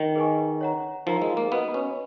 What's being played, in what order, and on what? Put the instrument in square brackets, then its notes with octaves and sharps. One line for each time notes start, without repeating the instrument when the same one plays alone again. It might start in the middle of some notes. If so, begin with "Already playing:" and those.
Already playing: [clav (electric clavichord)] D#3
[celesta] G#4 B4 D#5 G#5 C#6
C#5 F#5 A#5
[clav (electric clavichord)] F3 [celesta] D#4 A#4 F5 A#5
[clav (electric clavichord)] G#3
A#3
[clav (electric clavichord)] B3 [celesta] F#4 B4 D#5
[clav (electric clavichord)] C#4